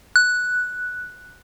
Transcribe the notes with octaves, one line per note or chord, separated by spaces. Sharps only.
F#6